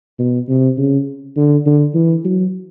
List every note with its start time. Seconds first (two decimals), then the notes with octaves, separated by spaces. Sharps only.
0.19 B2
0.49 C3
0.77 C#3
1.37 D3
1.66 D3
1.94 E3
2.25 F#3